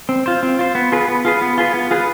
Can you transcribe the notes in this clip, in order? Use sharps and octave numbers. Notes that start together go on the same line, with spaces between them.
C4
F4 C5
C4
F4 C5
B3
F4 G#4 B4
B3
F4 G#4 B4
B3
F4 G#4 B4
B3
F4 G#4 B4